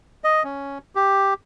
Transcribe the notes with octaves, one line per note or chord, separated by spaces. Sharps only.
D#5
C#4
G4